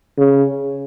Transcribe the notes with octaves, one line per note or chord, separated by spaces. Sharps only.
C#3